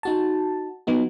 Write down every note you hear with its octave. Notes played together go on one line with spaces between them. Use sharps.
D#4 F#4 A5
F3 B3 D#4 F#4